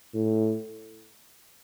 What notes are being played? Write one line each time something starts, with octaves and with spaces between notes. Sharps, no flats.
A2